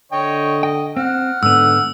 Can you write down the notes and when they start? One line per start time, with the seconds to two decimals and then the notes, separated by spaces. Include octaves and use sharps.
0.12 D3 C#5 D#5 G5
0.63 D#5 G5
0.97 C4 F#5 F6
1.43 G#2 D3 B3 E6